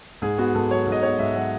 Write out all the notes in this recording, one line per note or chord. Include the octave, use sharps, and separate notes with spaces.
G#2 G#4
B3 F#4
G#2 A4
F#3 C#5
G#2
D#5
B3 C#5
G#2 E5
F#3 F#5